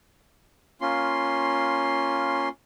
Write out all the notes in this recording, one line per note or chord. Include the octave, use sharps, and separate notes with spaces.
A#3 C#4 F4 C6